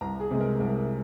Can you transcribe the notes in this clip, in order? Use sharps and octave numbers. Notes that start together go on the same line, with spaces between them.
C2 A#5
G#4
C3 G#3
A#4
C2 A#4